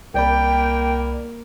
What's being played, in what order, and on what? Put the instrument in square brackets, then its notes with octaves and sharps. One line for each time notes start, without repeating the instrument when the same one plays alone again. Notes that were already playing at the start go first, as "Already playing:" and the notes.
[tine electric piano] C2 D5 B5 [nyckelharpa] A#3 [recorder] G5